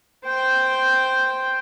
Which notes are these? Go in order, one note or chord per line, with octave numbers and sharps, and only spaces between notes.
C5 G5